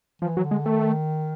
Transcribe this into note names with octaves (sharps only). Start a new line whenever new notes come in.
E3 F3
F#3
D3
G#3
D#3 A3